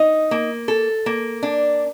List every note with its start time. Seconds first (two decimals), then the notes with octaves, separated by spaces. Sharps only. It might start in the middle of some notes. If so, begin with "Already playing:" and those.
Already playing: D#4
0.31 A#3
0.68 A4
1.06 A#3
1.43 D4